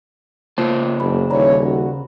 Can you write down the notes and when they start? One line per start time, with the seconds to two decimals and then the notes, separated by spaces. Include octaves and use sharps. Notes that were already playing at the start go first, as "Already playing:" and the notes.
0.58 C#3 A#3 F4 C5 A5
1.00 F#1 B5
1.30 D#1 D#2 E3 C#5 D5 A#5 B5
1.65 F#4